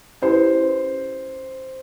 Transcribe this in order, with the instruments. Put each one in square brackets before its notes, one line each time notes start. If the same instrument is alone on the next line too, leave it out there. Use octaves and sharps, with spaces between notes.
[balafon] C#4 E4 G4 B4 [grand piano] C5